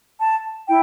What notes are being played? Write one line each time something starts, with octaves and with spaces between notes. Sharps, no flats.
A5
E4 G5